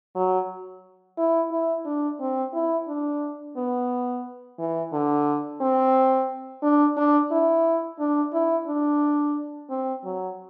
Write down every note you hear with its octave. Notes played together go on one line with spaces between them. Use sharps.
F#3
E4
E4
D4
C4
E4
D4
B3
E3
D3
C4
D4
D4
E4
D4
E4
D4
C4
F#3